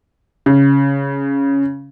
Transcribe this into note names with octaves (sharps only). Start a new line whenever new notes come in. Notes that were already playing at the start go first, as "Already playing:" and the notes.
C#3